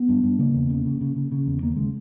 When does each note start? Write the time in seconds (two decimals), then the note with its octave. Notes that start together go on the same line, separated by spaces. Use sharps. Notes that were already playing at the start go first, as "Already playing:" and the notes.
Already playing: B3
0.09 G2
0.24 G2
0.39 C#3 A#3
0.54 E2
0.70 C#3
0.85 C#3
1.01 C#3
1.16 C#3
1.32 C#3
1.47 E2
1.62 D#2 A#3
1.76 C#3 G#3